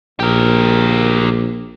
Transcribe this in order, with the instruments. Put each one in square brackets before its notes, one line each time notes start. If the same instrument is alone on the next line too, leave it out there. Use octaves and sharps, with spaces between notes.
[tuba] A#1 [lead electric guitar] G4 A#4